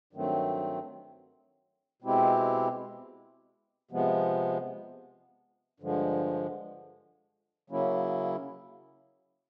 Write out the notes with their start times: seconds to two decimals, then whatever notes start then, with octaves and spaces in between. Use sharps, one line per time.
0.13 G2 D#3 F#3 A3 C4
2.02 B2 G#3 C4 E4 G4
3.91 C3 F3 G#3 B3
5.80 G2 D3 F3 G#3
7.70 C#3 F#3 A#3 C#4 E4